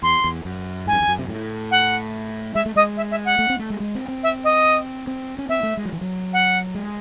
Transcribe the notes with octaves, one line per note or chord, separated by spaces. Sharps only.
E2 C6
E2
F#2
G#2 G#5
F#2
E2
F#2
C3
A2
F#5
G#3 E5
A3
G#3 D#5
E5
E5
F#5
A3
C4
A3
G#3
G#3
C4
C4
E5
D#5
C4
C#4
C4 E5
A3
G#3
F#3
E3
F#3
F#5
G#3